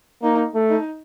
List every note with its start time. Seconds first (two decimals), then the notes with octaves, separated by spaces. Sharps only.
0.22 A#3 D#4
0.55 A3
0.70 D#4